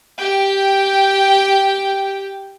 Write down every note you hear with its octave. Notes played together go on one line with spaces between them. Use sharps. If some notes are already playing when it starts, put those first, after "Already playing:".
G4 G5